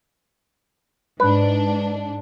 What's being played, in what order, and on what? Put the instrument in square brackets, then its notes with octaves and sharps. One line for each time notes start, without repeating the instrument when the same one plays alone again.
[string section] G#2 D4 [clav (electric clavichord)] B4